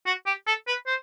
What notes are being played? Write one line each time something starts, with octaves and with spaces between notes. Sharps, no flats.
F#4
G4
A4
B4
C5